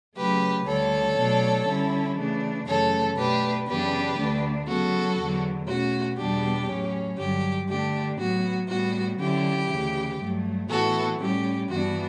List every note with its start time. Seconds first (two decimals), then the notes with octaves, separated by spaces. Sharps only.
0.16 C#3 F#3 A3 G4 B4
0.66 D2 D3 G3 A4 C#5
1.17 B2 F#3 A3 D4
1.66 D3 G3 C#4 E4
2.16 C#3 E3 A3 D4
2.67 F#2 C#3 E3 A3 A4 C#5
3.17 B2 A3 D4 G4 B4
3.67 F#2 C#3 E3 B3 D4 G4 B4
4.17 D2 D3 A3 D4
4.67 C#3 F#3 B3 F#4 A4
5.18 E2 D3 F#3
5.67 B2 A3 C#4 F#4
6.18 E2 B2 G3 B3 D4 G4
6.69 A2 F#3 C#4
7.18 G2 D3 F#3 G4
7.68 D3 A3 D4 G4
8.19 A2 F#3 B3 F#4
8.69 A2 G3 B3 F#4
9.19 D3 F#3 C#4 E4 G4
9.69 D2 C#3 E3
10.20 G2 F#3 A3
10.69 A2 E3 B3 E4 F#4 A4
11.20 A2 G3 C#4 G4
11.70 G2 E3 B3 D4 F#4